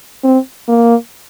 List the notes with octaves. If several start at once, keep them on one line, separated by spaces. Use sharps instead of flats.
C4
A#3